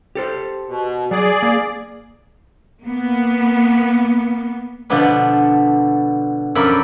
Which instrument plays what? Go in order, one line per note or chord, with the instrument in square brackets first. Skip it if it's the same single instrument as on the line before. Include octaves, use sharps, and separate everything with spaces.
[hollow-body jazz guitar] G4 A4 C5
[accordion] B2
[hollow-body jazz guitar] F#3 [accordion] G#4 D5
[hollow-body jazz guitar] A#3
[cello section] A#3 B3
[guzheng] B2 D3 F3 B3 D4 B4
F#2 F3 A4 A#4 D5 B5